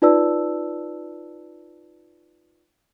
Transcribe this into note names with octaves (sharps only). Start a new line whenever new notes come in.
D#4 F4 B4 D5 A5 E6